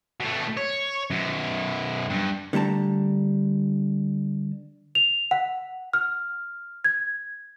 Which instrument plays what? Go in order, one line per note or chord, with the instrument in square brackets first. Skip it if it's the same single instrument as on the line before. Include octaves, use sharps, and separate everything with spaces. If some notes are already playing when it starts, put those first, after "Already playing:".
[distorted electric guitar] B2 A3
C#5
F#2 B2
G2
[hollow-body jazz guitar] D3 G3 A3 A5 A#5
[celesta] F7
F#5
F6
G#6